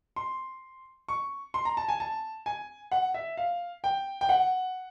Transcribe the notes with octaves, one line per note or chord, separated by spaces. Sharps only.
C6
C#6
C6
A#5
A5
G#5
A5
G#5
F#5
E5
F5
G5
G5
F#5